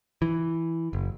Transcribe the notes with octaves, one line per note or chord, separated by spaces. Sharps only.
E3
F#1